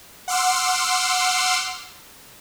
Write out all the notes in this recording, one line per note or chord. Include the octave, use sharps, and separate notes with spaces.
F#5 C6 D6 E6 F6